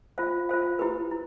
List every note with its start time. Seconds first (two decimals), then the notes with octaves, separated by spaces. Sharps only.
0.18 F4 C5 F5
0.49 F4 C5 F5
0.79 E4 G4 B4
1.11 E4